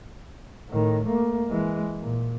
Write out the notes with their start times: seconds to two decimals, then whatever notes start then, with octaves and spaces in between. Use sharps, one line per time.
0.69 A2 D#3
1.05 A3 A#3
1.47 E3 G#3
2.00 A#2